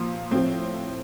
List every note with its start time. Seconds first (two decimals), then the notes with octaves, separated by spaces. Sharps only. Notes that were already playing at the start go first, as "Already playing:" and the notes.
Already playing: A#2 F3
0.31 A2 F3 C4